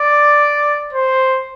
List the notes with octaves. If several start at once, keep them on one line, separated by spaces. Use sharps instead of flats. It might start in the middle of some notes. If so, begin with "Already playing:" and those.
Already playing: D5
C5